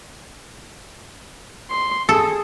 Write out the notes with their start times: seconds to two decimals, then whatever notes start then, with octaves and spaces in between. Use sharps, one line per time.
1.70 C6
2.09 G#4 A4